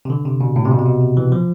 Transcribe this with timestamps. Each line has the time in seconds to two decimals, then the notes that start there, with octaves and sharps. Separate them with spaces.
0.05 C3
0.10 D3
0.25 C3
0.41 B2
0.56 A2
0.65 C3
0.71 B2
0.79 C3
0.86 B2
1.01 C3
1.17 E3
1.32 F3